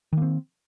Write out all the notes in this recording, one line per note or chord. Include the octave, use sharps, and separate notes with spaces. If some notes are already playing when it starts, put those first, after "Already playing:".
D#3 A#3 C4